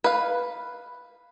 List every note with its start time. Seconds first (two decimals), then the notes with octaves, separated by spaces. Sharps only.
0.04 B4 F5